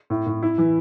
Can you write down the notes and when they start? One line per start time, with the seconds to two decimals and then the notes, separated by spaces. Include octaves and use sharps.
0.10 A2
0.26 A2
0.43 E4
0.58 E3